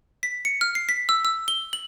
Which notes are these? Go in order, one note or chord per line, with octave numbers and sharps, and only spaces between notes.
B6
C#7
F6
C7
B6
E6
E6
G7
F#7